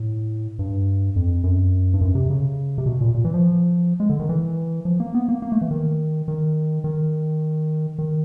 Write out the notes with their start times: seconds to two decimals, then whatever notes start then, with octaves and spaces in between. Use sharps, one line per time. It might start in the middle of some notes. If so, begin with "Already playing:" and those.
Already playing: A2
0.59 G2
1.16 F2
1.43 F#2
1.93 G2
2.01 F#2
2.15 C3
2.30 C#3
2.78 C3
2.86 B2
3.01 A#2
3.14 A#2
3.25 E3
3.34 F3
4.00 G#3
4.09 D3
4.19 D#3
4.29 E3
4.85 F3
5.00 A#3
5.14 B3
5.28 A#3
5.42 A#3
5.52 A3
5.61 E3
5.71 D#3
6.28 D#3
6.84 D#3
7.98 D#3